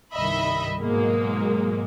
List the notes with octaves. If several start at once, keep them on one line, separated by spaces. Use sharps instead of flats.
C2 G2 D#3 D#5 E5 B5
G#2 B2 F#3 G#3 A#3